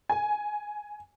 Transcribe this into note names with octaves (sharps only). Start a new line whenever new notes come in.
G#5